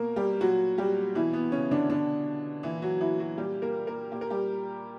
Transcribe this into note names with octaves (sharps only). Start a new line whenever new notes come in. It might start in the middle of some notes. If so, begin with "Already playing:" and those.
Already playing: B2 A#3 A#4
G3 G4
A#2 F#3 F#4
G3 G4
B2 E3 E4
B3
C#3 C#4
D3 D4
B2 D3 D4
A#2 E3 E4
F#3 F#4
E3 E4
F#3 F#4
A#2 G3 G4
A#3 A#4
A#3 A#4
A#2 G4
A#4
G3 G4